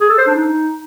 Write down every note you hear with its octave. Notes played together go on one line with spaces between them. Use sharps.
G#4
A4
C5
D4
D#4